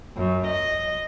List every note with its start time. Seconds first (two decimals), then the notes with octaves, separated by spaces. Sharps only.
0.17 F#2
0.46 D#5